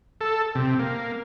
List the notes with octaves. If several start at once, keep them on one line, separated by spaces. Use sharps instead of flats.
A4
C3
A#3